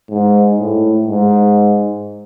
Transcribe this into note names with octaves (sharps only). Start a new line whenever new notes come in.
G#2
A2
G#2